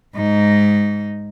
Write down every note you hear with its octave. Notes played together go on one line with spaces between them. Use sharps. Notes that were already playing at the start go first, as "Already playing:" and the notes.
G#2 D#4